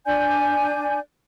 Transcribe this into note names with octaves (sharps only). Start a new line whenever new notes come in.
D4 D5 G#5 G6